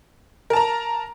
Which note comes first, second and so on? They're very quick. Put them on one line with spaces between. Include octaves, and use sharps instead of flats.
A#4 A5 A#5